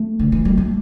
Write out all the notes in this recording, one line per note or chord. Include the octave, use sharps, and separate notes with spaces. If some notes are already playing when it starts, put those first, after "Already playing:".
Already playing: A3
D3
E3
G3
A3